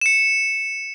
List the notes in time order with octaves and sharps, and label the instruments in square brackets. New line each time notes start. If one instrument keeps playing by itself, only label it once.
[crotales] C#7 E7